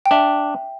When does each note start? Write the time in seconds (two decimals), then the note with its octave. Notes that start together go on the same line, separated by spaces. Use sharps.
0.06 G5
0.11 D4 E5